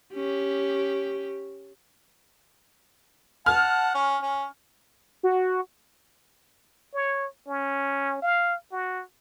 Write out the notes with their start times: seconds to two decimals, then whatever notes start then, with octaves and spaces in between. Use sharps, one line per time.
0.14 C#4 G4
3.46 F#5 A5 F6
3.94 C#4
4.22 C#4
5.23 F#4
6.94 C#5
7.48 C#4
8.22 F5
8.72 F#4